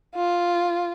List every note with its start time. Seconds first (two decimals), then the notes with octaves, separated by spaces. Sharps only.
0.15 F4